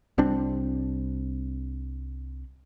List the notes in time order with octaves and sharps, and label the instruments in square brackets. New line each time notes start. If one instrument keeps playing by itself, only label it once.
[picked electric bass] C2 G3 C4 D4